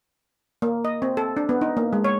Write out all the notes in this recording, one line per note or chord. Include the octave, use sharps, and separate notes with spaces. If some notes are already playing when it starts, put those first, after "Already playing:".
A#3
D#5
C4
A4
D4
B3
D#4
A#3
G#3
C#5